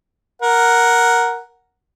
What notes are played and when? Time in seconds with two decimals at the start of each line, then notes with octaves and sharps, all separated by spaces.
0.42 A#4 F#5